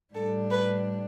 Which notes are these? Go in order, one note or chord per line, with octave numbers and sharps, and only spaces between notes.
A2 G3 D4 A4
B4